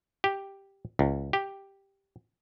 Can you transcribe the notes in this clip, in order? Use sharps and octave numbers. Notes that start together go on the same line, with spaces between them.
G4
C#2
G4